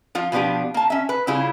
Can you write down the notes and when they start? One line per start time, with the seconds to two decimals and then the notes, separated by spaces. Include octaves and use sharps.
0.15 F3 F4
0.32 B2 F3 B3 D4 G4
0.74 A#3 A5
0.90 C#4 E5
1.09 B4
1.27 C#3 G3 E4 F4 G#4